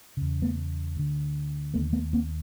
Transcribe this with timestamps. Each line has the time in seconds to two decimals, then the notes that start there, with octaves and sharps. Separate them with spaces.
0.17 E2 C#3
0.42 A3 B3
0.96 D2 D3
1.74 D#2 D3 A3 B3
1.93 A3 B3
2.13 A#3 C4